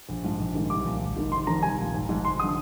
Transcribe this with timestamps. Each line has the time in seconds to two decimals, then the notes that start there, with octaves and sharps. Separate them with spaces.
0.09 A#1
0.24 G#2 F3
0.39 A#1
0.55 G#2 D#3
0.70 C2 D6
0.85 A#2 F3
1.02 G#1
1.16 G#2 D#3
1.32 F1 C6
1.47 F2 D#3 A#5
1.63 C2 G#5
1.78 A#2 F3
1.93 G#1
2.09 G#2 F3
2.24 F1 C6
2.40 D3 F3 D#6